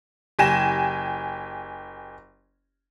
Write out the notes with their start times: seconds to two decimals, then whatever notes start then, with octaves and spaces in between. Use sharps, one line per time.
0.39 F#1 G4 G#5 A#6 E7